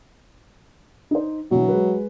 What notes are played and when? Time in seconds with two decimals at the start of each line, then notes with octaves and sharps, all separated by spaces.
1.11 D#4 C5
1.51 B2 D3 E3 F#3
1.69 G#3 B4